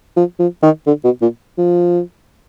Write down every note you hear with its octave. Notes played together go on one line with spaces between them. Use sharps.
F3
F3
D#3
D3
B2
A#2
F3